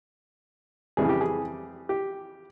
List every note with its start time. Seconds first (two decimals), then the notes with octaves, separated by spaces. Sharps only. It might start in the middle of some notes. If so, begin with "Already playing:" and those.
0.97 F2 C#3 E3 G3 G#4
1.09 G4
1.21 G#4
1.89 G4